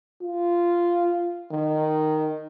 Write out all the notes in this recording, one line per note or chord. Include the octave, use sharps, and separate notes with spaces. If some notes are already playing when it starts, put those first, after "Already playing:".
F4
D#3